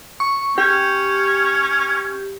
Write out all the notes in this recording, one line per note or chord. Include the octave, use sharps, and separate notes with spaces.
C#6
C#4 G4